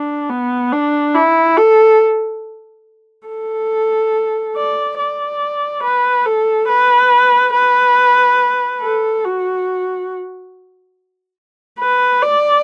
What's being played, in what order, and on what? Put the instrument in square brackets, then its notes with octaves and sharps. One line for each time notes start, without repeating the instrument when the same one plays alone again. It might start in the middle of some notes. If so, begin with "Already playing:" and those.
Already playing: [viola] D4
B3
D4
E4
A4
A4
D5
D5
B4
A4
B4
B4
A4
F#4
B4
D5